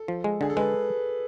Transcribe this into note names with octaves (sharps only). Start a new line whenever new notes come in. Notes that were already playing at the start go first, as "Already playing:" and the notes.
Already playing: A4
F3
G#3
D3 G#4
A4
G#3 B4